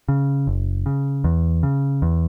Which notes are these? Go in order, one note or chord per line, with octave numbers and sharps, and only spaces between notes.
C#3
F#1
C#3
E2
C#3
E2